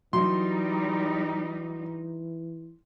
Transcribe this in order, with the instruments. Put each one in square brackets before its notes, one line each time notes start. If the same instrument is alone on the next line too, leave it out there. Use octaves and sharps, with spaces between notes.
[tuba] E3 [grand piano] F#3 [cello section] G3 D#4 [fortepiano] C6